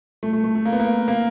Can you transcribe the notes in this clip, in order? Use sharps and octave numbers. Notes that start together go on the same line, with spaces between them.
A3
A3
A3
A3
A#3
B3
A#3
A#3